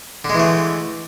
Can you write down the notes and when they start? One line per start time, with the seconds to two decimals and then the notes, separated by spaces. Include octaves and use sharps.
0.24 D3
0.29 G#3
0.34 E3
0.39 A3